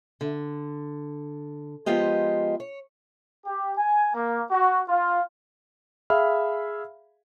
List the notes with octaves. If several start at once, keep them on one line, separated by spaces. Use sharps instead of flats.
D3
F3 G#3 B3 F4 G4 D#5
C#5
G4
G#5
A#3
F#4
F4
G#4 E5 F5 B5 F6